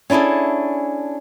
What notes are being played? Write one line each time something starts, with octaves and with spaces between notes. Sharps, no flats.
C#4 D4 E4 G#4 A4